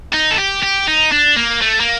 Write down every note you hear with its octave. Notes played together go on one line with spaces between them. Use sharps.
D#4
A4
G4
G4
D#4
D4
A#3
A3
A#3